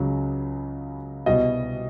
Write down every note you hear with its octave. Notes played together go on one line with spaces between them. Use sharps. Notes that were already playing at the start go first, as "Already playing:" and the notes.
Already playing: C#2 C#3 F#3
C2 B2 G3 D#5